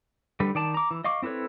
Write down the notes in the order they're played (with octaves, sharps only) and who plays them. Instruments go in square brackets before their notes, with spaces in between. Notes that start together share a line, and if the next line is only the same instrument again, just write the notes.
[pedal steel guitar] D3 G3 B4
D#3 D5 A5
A#5 D6
E3
D#5 F5 C#6 D6
C4 E4 A4 B4 C#5